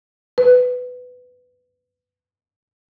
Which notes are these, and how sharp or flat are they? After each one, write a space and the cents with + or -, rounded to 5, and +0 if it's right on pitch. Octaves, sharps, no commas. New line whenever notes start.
B4 +15